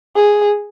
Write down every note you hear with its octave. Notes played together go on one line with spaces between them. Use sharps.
G#4